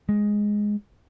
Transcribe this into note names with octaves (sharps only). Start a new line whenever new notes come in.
G#3